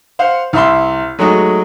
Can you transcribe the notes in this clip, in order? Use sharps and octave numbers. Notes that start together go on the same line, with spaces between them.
C5 F5 F#5
C2 E5 C6
F#3 G#3 A3 D#4 F#4